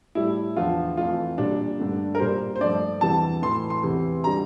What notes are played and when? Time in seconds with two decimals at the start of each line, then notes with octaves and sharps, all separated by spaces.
0.15 A2 G3 E4
0.56 E2 D3 F3 F4
0.97 F2 E3 A3 F4
1.38 A#2 G3 D4
1.79 G2 D3 A3
2.15 A#4
2.19 A#2 G3 C5
2.56 C5
2.60 G2 F3 A3 D5
3.01 E2 C3 E3 G3 A5
3.42 A2 E3 A3 C6
3.70 C6
3.83 E2 C3 E3
4.24 D3 G3 A#5